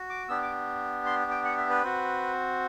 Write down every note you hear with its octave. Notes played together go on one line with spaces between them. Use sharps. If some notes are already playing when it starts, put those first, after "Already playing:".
Already playing: F#4
D6
B3 D4 G4 E6
D6
C6
G5
F#5
E5
B4
C4 F#4